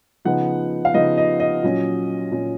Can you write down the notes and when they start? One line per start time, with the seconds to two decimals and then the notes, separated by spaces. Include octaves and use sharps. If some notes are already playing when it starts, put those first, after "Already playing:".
0.25 C#3 F3 B3 D#4 F#5
0.85 F5
0.94 C#3 F3 B3 D#4 D#5
1.17 D#5
1.40 D#5
1.63 A#2 F#3 C#4
2.32 A#2 F#3 C#4